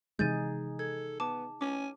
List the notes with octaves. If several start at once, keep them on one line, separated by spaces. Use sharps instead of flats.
C3 E3 G#3 D#4 G#4 G6 A6 D#7
A4 G#6
B3 A5 D6
C#4 D6